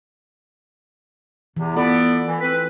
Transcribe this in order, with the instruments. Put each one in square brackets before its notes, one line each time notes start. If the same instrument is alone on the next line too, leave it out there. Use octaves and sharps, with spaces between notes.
[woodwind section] E2 C3 [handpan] E3
[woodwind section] B3 D5 [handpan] F4 A4
[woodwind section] E3
C4 B4